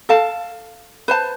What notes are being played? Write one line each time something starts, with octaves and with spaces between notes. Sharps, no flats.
A4 F5 A5
B4 C5 A5